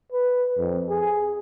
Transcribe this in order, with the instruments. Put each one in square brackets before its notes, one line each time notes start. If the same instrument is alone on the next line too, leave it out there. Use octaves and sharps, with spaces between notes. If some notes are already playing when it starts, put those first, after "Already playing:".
[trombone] B4
F2
G#4